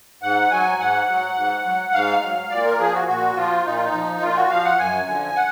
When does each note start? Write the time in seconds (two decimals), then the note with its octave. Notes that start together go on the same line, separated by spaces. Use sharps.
0.22 G#2 F#5
0.51 F#3 G#5
0.80 G#2 F#5
1.08 F#3
1.37 G#2
1.65 F#3
1.94 G#2 F5
2.22 F#3
2.51 A#2 D5
2.65 A#4
2.79 F3 G#4
2.94 F#4
3.08 A#2 F#4
3.36 F3 F4
3.65 A#2 D#4
3.75 F4
3.84 D#4
3.93 F3
4.21 A#2 F4
4.36 F#4
4.50 F3 F5
4.65 F#5
4.79 F#2 G#5
5.07 D3 F3
5.36 F#5